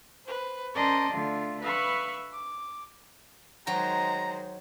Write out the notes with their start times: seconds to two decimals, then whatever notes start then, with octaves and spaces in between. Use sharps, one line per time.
0.24 B4 C5
0.75 C#4 A#4 C5 D5 D#5 A5
1.10 D3 A3 F4
1.62 B4 E5 F5 B5 C#6
2.32 D6
3.67 D#3 F#3 G#3 F#4 C5 G5 A#5